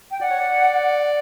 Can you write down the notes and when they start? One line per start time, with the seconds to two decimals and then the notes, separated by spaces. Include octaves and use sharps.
0.11 G5
0.21 D5 F#5
0.31 C#5
0.40 D5